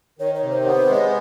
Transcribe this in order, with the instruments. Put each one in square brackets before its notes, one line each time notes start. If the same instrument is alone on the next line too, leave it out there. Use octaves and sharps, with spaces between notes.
[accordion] D#3 [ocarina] C#5
[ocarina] C#5
[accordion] C3
[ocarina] C5
[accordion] B3
[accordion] G#3 [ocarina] C#5
[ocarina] C5